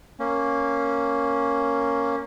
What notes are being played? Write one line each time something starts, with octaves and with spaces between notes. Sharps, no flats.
A#3 C#4